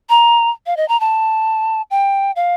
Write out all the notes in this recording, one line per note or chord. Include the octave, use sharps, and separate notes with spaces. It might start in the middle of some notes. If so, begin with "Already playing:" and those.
A#5
F5
D#5
A#5
A5
G5
F5